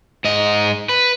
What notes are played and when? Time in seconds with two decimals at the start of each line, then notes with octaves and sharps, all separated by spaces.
0.24 G#2 D#5
0.89 B4